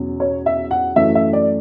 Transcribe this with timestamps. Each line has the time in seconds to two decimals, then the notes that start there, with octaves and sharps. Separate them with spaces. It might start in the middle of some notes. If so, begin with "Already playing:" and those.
Already playing: E2 B2 F#3 C#4
0.20 C#5
0.46 E5
0.71 F#5
0.96 F#2 E3 A3 E5
1.15 E5
1.33 D5